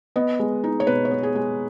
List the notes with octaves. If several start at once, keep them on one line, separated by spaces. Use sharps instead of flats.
B3 D#5
G#3
D#4
C#5
B2 B4
C#5
B3
G#4
G#3